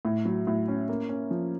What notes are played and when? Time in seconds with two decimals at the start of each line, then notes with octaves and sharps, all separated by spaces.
0.05 A2
0.25 F#3
0.47 A2
0.68 C#4
0.89 A#3
1.09 C#4
1.31 F3